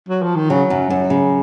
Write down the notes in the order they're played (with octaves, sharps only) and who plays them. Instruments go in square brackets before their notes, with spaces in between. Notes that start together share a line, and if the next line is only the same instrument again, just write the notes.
[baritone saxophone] F#3
F3
D#3
[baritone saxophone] C#3 [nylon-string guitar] F#3
[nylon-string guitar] F#2
F#2
C#3